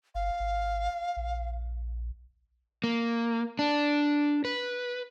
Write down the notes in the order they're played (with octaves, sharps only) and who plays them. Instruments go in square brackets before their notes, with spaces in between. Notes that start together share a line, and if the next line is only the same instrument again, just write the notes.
[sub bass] G1 [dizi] F5
[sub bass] G#1
A#1
[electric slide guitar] A#3
D4
B4